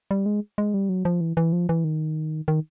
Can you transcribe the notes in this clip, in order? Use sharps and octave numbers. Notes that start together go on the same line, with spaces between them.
G3
G#3
G#3
G3
F#3
F3
E3
E3
F3
E3
D#3
D#3